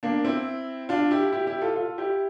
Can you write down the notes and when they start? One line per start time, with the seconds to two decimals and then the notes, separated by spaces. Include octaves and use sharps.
0.03 A#3 D4
0.24 C4 E4
0.89 D4 F4
1.11 E4 G4
1.32 E4 G4
1.47 E4 G4
1.61 F4 A4
1.76 F4 A4
1.98 E4 G4